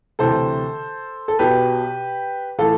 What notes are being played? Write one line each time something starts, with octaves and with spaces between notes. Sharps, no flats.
D2 C3 E3 A4 C5
A4
B1 B2 G4 B4
A2 E3 F4 A4